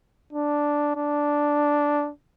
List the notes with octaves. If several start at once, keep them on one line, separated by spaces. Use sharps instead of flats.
D4
D4